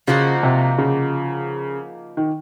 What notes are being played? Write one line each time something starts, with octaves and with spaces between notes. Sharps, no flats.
C#3 F3 A#3 D#4 F#4
C3
C#3
D#3